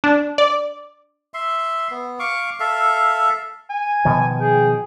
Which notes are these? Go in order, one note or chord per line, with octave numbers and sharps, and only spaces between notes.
D4
D5
E5 C6
B3
F5 C#6 D6
A4 E5 F5
G#5
B2 D#3 F3
G#4 G5